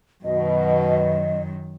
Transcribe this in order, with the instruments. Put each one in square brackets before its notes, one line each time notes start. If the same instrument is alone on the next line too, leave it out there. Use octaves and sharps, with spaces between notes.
[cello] F#2 D#3 [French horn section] B2 [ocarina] D#5